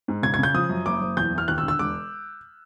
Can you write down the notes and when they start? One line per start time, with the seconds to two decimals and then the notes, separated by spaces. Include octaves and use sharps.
0.08 G#2
0.23 C#3 G#6
0.34 G#6
0.39 C#3 G6
0.54 F3 D#6
0.69 F#2
0.86 F#1 D6
1.01 F#1
1.17 E2 G6
1.33 E3
1.38 F6
1.48 D#2 F#6
1.58 E6
1.63 D3
1.68 E6
1.79 E1 D6